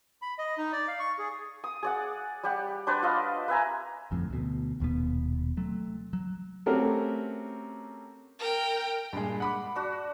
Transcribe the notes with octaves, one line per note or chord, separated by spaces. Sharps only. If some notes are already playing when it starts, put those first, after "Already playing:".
B5
D#5
D#4
D5
F5
C#6
G#4
D#6
G#4 D5 F#5
G3 G4 F#5
D4 B4 C5 D5
F4 D#5 F5
B4 E5 G#5 A#5
G1 F2 A2
D2 B2
D#1 D#2 B2 B3
C3 F#3 A3
F#3
A3 C4 C#4 F#4 G4 A#4
A#4 G5
G2 A#2 G#3
F#5 B5 D6
D4 F#4